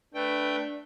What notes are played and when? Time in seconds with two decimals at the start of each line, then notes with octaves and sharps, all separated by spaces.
0.14 A3 D4 B4 G5